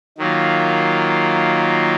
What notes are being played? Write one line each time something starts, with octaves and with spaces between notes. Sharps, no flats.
D#3 F#3 A#3 F4